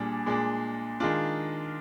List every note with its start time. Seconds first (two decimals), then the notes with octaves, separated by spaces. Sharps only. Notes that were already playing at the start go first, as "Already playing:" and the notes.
Already playing: A#2 G3 D4 G#4
0.26 A#2 G#3 D4
1.00 D#3 G#3 D4 F4